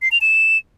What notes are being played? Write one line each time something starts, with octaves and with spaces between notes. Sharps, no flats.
C7
F7
E7